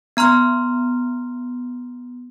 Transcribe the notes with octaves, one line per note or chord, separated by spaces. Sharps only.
B3 A#5 C6 F6